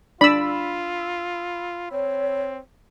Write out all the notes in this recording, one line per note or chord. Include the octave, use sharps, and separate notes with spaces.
D4 F4 D5 B5 E6
C4 C#5